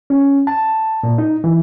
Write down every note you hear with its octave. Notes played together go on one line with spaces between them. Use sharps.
C#4
A5
A#2
D#4
E3